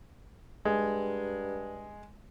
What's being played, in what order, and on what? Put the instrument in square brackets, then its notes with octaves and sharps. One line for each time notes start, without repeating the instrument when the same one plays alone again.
[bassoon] G2 [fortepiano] G#3